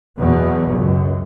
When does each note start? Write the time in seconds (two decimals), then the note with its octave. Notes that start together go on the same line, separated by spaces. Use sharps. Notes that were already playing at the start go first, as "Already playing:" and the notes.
0.21 E2 B2 F#3
0.74 C#2 F#2